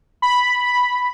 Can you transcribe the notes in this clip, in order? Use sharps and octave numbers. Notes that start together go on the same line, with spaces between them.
B5